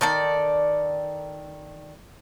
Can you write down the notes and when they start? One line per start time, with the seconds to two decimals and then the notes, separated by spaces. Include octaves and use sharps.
0.01 D#3 A4 D5